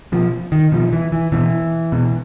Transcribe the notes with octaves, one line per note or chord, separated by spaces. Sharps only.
B2 F3
D#3
B2 F3
E3
E3
B2 E3
B2